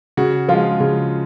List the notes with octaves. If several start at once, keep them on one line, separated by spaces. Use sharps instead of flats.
C#3 F#4
F3 G#3 F4
C#3